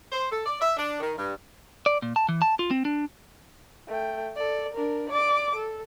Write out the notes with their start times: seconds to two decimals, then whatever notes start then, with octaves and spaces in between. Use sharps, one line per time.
0.12 C5
0.31 A4
0.46 D5
0.61 E5
0.77 D4
1.00 D#3
1.16 G2
1.86 D5
2.02 A#2
2.16 A5
2.29 E3
2.42 A5
2.59 F4
2.71 C4
2.85 D4
3.88 A3 G5
4.36 A4 D5
4.73 D4 A#4
5.09 D5 D6
5.55 A4